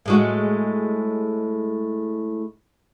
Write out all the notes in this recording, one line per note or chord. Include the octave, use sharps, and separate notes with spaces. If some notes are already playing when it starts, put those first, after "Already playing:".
A2 G#3 F#4